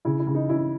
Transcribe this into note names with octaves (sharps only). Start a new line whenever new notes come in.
C#3 E4
E4
C#3
D#4
C#4 E4